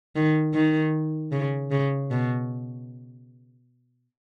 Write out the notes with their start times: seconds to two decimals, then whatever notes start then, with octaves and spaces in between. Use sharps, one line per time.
0.16 D#3
0.54 D#3
1.32 C#3
1.71 C#3
2.11 B2